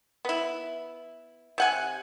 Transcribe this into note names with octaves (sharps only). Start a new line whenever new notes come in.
B3 E4
C3 F#5 G#5